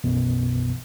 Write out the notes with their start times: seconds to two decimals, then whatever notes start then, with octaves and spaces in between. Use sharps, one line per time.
0.04 B1 F#2 B2 E3 B3